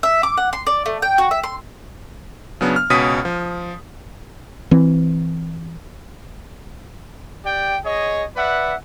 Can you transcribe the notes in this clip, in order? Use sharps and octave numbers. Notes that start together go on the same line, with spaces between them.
E5
D6
F#5
C6
D5
A3
G5
F#4
E5
C6
C#3 F#3 B3 D4
F6
C#2 B2 C#4 D#6 B6 D#7
F3
E3 C4
G4 D5 G5
G#4 C#5 D#5
B4 D5 E5 F#5